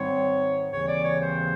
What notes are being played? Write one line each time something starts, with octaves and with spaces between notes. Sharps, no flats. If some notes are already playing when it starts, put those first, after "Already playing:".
Already playing: G#2 D#3 G3 C4 C#5
D#2 C#3 E3 G3 C4 C#5
D5
C#5
C5